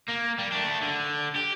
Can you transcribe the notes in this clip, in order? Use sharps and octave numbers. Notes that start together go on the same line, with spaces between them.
A#3
G3
A3 D4
D3
G4